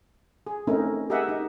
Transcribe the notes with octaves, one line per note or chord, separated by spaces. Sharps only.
G#4
A3 C4 C#4 D#4 E4 A#4
G4 G#4 A#4 D#5 E5 F#5
D#4